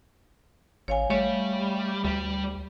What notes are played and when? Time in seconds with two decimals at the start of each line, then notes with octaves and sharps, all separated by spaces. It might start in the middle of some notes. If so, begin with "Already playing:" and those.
0.88 A1 C#5 F5 G#5
1.10 G3 A3 C#5
2.04 D2 G3